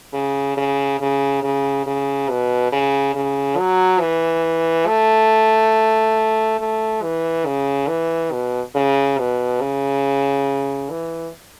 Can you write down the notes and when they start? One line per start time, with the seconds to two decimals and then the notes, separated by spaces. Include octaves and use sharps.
0.13 C#3
0.57 C#3
1.00 C#3
1.43 C#3
1.87 C#3
2.30 B2
2.73 C#3
3.15 C#3
3.58 F#3
4.01 E3
4.87 A3
6.59 A3
7.03 E3
7.46 C#3
7.88 E3
8.32 B2
8.75 C#3
9.19 B2
9.61 C#3
10.90 E3